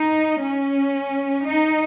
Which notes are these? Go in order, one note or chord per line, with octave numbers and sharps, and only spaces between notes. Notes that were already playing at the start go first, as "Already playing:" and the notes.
Already playing: D#4
C#4
D#4